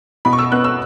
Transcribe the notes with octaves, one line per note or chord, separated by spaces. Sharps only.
B2 B5
C#6
E6
B3 F#6
E6